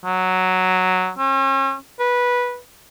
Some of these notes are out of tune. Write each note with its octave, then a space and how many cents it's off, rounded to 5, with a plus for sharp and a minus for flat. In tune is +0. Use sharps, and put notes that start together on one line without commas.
F#3 +0
C#4 -40
B4 -15